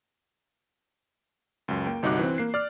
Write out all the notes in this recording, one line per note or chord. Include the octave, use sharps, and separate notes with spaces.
C#2 F#2
A#3 G5
G1 C2 D#4 F#4 D6 F#6
E3 C4
A#3 C7
D5 F6